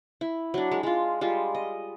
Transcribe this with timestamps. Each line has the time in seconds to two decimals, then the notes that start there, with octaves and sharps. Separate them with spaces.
0.21 E4
0.54 F#3 D4
0.72 G#3
0.83 G#3 F4
1.21 G3 G#3 F4
1.55 D#5